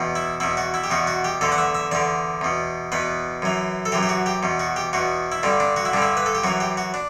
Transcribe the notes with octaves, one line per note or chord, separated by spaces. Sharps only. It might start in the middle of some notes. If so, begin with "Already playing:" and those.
Already playing: E2 B2
E4
E2 B2 E4
F#4
E4
G4
E2 B2 F#4
F#4
G4
E2 D3 A4
F#5
E5
E5
E2 D3 D5
E2 B2
E2 B2 B4
F#2 E3
A4
F#2 E3 G4
G4
F#4
G4
E2 B2
F#4
G4
E2 B2 F#4
E4
G2 D3 D4
D4
F#4
E4
G2 D3 D4
E4
B4
A4
G4
F#2 E3 F#4
G4
F#4
D4